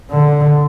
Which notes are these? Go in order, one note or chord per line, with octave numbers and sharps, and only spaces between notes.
D3